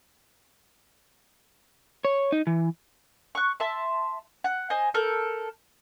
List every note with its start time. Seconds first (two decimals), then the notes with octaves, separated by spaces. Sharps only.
2.05 C#5
2.32 D#4
2.47 E3
3.35 C#6 F#6
3.60 E5 A5 C6
4.44 F#5
4.70 C5 D#5 G#5
4.94 A4 A#4 G6